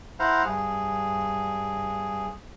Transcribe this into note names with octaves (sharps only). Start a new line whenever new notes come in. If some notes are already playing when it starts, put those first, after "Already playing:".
E4 C5 F5 F#5 A#5
G2 G#4